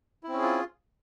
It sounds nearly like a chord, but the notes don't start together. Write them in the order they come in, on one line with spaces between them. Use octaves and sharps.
E4 C4 C#4 G#4 F4